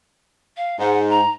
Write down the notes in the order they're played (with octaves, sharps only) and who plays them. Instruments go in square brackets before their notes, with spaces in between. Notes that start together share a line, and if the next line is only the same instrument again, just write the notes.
[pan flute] F5
[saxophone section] G#2 [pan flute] F#5
[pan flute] A#5